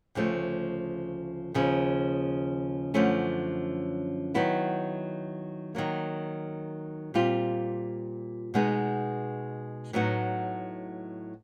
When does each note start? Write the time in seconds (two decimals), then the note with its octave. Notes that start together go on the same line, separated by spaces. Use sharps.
0.15 D2 C#3 F3 A3
1.54 D#2 C#3 F3
2.94 F#2 D3 F3 A3 C#4
4.34 D#3 F#3 B3 E4
5.75 D#3 F#3 A#3
7.14 A#2 G3 C4 F4
8.54 B2 G#3 B3 D#4
9.93 A2 F#3 B3 D#4 F#4